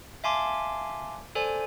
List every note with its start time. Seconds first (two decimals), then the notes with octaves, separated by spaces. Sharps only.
0.24 E5 F5 G#5 A5 C6 D6
1.35 A4 C5 D5 G#5